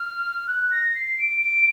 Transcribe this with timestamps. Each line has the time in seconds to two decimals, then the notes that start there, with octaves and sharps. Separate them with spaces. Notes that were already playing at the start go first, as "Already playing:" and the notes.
Already playing: F6
0.47 F#6
0.71 A#6
0.95 C7
1.18 D7
1.41 D7